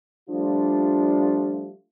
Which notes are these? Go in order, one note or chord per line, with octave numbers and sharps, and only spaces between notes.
F3 G3 A3 D4 F4